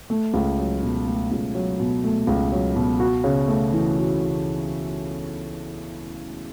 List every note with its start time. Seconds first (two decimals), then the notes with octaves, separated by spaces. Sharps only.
0.10 A3
0.34 C#2
0.59 F#3
0.83 B2
1.07 A3
1.31 C#2
1.55 F#3
1.80 B2
2.04 A3
2.27 C#2
2.52 F#3
2.76 B2
3.00 F#4
3.24 C#3
3.48 A3
3.73 E3
3.97 F#4
4.21 C#3